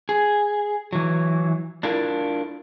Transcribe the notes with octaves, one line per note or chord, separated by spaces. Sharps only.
G#4
E3 F#3
D4 E4 F4 A4 A#4